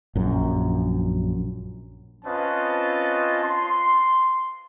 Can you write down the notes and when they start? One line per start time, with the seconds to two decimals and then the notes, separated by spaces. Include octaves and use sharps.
0.15 A#1 F#2
2.25 C4 C#4 F4 B4 D#5 A5
3.43 C6